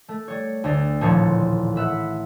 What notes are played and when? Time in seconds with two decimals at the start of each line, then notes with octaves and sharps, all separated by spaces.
0.08 A3
0.28 G3 C#5
0.64 D2 D3 D4
1.01 D#1 A1 A#2 F3 C#5 A5
1.76 B4 E5 F#5